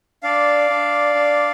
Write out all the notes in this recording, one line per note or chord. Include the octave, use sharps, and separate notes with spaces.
D4 D5 F5
D4
D4